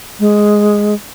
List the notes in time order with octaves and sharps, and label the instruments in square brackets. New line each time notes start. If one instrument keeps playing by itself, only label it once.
[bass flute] G#3